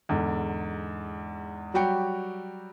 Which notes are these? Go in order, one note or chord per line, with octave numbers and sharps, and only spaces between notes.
E2 G#2 D3
F#3 G3 F#4 G4 G5 C#7